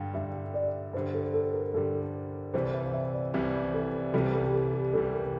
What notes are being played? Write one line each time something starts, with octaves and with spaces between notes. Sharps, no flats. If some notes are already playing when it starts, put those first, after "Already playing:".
Already playing: G2 D3 G3 F5 G5
G2 D3 G3 E5
D5
G2 D3 G3 C5
A4
A4
A#4
G2 D3 G3 A4
C2 C3 E3 G3 C5
E5
F5
E5
D5
C2 C3 E3 G3 E5
A4
C2 C3 E3 G3 A4
A4
G4
A4
G4
C2 C3 E3 G3 A4
A#4